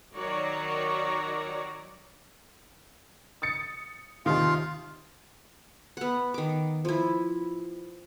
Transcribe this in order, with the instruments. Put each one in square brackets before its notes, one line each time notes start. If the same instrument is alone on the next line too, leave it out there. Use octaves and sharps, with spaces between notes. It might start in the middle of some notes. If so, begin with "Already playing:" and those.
[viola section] D#3 F#3 F#4 C#5 D5 A#5
[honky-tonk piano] D#6 A6 C#7
[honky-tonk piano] D#2 C3 D#3 [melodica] F4 F5
[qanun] B3 F#5
D#3 D6
F3 E4